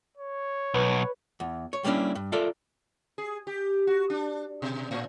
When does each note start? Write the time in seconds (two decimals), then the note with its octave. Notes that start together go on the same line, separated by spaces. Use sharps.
0.17 C#5
0.74 B1 B4
1.40 E2
1.73 C#5
1.84 G3 A#3 B3 C#4 D4 E4
2.15 G2
2.32 F4 A4 A#4 D5 E5
3.18 G#4
3.47 G4
3.87 F#4
4.10 D4
4.62 B2
4.91 A2